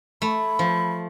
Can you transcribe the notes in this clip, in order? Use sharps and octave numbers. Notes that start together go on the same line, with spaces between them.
A3 B5
F3